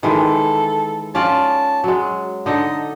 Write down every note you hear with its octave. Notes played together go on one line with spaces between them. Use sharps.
D#3 E3 G#3 A4
C#4 F4 D5 A5
F#3 G#3
D3 D#4 A4 D#5